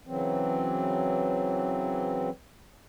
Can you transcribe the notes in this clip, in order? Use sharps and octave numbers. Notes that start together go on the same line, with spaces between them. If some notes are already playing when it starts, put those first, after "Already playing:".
C#3 E3 F#3 C4